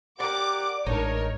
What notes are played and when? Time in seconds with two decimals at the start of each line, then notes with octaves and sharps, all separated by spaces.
0.20 G4 A#4 D5 F#5 D6
0.86 A1 G#2 D4 D#4 A#4 C#5